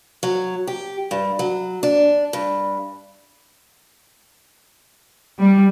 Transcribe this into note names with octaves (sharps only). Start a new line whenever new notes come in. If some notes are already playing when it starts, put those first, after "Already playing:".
F#3
G4
G2
F#3
D4
G2
G3